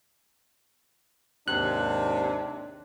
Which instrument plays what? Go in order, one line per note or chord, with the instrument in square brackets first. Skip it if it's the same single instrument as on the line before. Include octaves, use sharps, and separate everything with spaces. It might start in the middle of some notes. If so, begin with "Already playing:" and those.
[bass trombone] D#2 [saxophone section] G#2 C3 [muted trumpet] D4 [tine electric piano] F#6